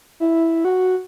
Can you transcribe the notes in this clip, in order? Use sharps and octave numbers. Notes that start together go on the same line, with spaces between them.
E4
F#4